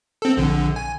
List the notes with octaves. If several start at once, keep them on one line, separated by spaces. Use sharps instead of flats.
C4 A4
A#1 D3
G#5